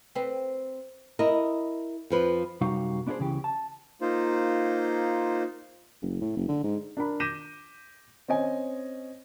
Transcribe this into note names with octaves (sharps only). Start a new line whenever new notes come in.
C4 B4
E4 A#4 D#5
F2 F3 B4
F#2 C3 G3 D#4 F#4 F5
B3 D4 E4 F#4 G#4 C5
C#2 C#3 E3 G4
A5
A#3 D#4 F4 C5
F#1
A2
F#1
D3
G#2
D4 A#4 B5
D6 G6 A#6 B6 D#7 E7
C4 C#4 D#5 G#5